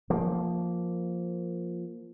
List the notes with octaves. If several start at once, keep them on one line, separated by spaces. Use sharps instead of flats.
F3 A#3